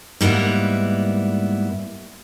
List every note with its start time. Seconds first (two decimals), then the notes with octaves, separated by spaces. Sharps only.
0.21 G#2 G3 A#3 B3 E4